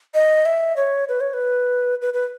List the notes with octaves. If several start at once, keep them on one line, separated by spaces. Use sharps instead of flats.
D#5
E5
C#5
B4
C#5
B4
B4
B4